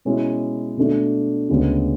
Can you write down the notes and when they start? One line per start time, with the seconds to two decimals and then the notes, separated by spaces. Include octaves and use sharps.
0.05 B2 G#3 C#4 E4
0.77 B2 A3 D4
1.49 D2 C#3 G#3 B3 D4